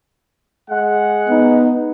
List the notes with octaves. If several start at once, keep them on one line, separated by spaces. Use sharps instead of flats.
G#3 F#5
B3 D#4